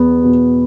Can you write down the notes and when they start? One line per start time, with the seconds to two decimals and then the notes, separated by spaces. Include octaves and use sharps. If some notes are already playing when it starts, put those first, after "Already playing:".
Already playing: E2 B3
0.24 B2